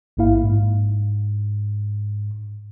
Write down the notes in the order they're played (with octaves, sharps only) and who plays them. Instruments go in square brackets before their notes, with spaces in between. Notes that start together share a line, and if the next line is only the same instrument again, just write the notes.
[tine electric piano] A1 G#2 A#3 E4 F5
G#2